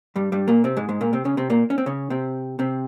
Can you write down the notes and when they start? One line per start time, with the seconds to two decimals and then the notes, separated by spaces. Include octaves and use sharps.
0.16 G2 G3
0.32 G2 G3
0.48 A#2 A#3
0.64 C3 C4
0.77 G#2 G#3
0.89 G#2 G#3
1.01 A#2 A#3
1.13 C3 C4
1.25 C#3 C#4
1.37 C3 C4
1.50 A#2 A#3
1.70 C#4
1.78 C4
1.86 C#3 C#4
2.10 C3 C4
2.59 C3 C4